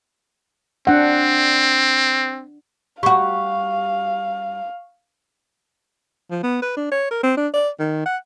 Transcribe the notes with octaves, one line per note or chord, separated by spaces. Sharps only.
C4 D4 F#5
G3 F#4 F5 C#6
F3
B3
B4
D4
C#5
A#4
C4
D4
D5
D#3
F#5